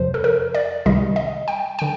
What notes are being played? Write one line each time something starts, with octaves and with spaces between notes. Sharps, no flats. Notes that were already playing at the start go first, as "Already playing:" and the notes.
Already playing: F2 C3 F3 C5
A4
A#4
D5
C2 C3 D#3 G3 D#5
D#5
G5
D3 G5